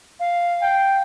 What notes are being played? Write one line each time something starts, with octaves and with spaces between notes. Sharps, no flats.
F5
G5